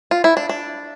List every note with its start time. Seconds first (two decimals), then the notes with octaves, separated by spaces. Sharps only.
0.11 F4
0.24 E4
0.37 D4
0.49 D4